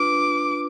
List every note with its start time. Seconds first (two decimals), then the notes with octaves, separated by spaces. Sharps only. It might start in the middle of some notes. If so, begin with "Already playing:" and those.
Already playing: D4 F4 B4 D6